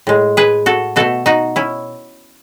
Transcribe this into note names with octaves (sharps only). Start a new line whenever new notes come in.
A2 G#3
G#4 B4
F#4 A4
B2 A3 F#4 A4
D#4 F#4
C#4 E4